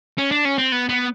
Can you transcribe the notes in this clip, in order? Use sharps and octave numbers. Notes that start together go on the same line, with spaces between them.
C#4
D4
C#4
C4
B3
B3